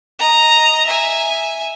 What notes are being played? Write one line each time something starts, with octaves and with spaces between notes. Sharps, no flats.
D#5 A#5
E5 G#5